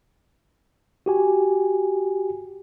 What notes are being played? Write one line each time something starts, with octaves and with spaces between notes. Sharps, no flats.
F#4 G4 G#5